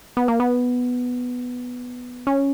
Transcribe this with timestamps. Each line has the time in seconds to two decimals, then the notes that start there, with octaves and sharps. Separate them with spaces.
0.17 B3
0.28 A#3
0.40 B3
2.27 C#4